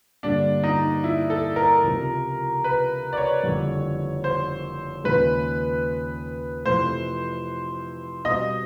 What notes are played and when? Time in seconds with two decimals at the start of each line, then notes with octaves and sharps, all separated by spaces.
0.23 G2 D3 G3 A#3 D4
0.64 D#4
1.04 E4
1.30 A4
1.56 A#4
1.83 C#2 C3 F3
2.64 B4
3.13 D5
3.17 C#5
3.43 F#1 F2 D3 G3
4.24 C5
5.04 D#2 C#3 F3 G#3 B4
6.65 F2 C3 E3 A3 C5
8.25 B2 G3 C4 D#5